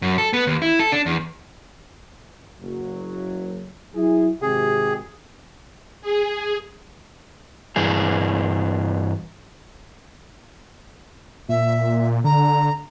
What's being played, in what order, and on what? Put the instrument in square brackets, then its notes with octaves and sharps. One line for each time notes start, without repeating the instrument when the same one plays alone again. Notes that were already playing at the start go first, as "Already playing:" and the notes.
[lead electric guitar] F#2
A4
B3
D#2
E4
A4
D4
E2
[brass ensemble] F#1 F#3
F#3 E4 G#4
[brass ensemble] G#1 C3 G4 [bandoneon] G#4
[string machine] G#4
[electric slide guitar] G2 E3 G#4
[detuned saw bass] A#2 [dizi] E5
[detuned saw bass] D3 [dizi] A#5